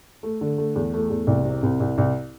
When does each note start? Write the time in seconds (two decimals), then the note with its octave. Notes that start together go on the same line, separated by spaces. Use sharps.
0.23 A3
0.41 D3
0.58 A3
0.76 E2
0.94 A3
1.10 E2
1.27 C2
1.45 C3
1.63 C2
1.80 C2
1.98 C2